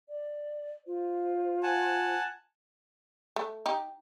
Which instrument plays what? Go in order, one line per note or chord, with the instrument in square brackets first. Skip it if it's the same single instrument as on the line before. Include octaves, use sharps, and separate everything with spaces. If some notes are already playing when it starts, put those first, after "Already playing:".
[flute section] D5
F4 C5
[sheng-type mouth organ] F#5 G#5 A5
[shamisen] A3
D#4 G4